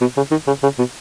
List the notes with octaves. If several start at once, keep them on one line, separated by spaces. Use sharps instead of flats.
B2
C#3
D#3
C#3
C#3
B2